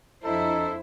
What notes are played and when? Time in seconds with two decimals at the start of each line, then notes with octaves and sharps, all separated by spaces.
0.24 F2 D4 E4 A4 C5 D#5 A#5